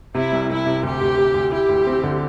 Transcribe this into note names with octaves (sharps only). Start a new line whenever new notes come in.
C3 E4
C2
C2 E4
C3
D2 G4
D2
D2
D2
E4 G4
D2
C4
D3